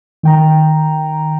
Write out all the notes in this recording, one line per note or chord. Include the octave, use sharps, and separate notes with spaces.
D#3 G5 A#5